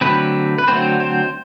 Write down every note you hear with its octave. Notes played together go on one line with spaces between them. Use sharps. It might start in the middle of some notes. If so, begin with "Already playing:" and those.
D3 F#3 A3 C4 B4
B4
D3 F#3 A3 C4 C5
C5